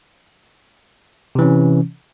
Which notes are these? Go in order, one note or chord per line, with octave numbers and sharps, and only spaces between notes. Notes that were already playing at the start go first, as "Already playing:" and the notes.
C3 E3 C#4